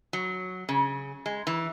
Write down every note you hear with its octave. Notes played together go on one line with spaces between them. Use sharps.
F#3
C#3
G#3
E3